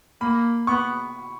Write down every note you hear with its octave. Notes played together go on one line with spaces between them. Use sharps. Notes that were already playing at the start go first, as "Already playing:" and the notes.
A#3 B5
B3 C#6